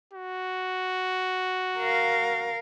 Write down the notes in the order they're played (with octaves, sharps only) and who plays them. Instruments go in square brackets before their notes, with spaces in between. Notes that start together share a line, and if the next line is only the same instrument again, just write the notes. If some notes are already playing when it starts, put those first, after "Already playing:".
[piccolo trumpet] F#4
[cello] A#4 F5